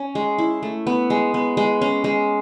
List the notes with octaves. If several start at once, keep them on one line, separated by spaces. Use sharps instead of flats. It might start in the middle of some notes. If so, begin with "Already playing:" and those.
Already playing: C#4
G#3
E4
A3
B3
G#3
B3
G#3
C#4
G#3